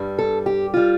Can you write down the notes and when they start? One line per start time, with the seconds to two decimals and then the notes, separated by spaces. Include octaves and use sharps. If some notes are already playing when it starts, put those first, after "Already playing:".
Already playing: G2 G3
0.19 A4
0.46 G4
0.74 G3 F4